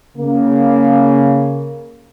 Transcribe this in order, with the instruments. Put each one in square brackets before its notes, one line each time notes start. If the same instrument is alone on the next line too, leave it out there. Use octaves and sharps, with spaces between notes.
[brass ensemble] C#3 A#3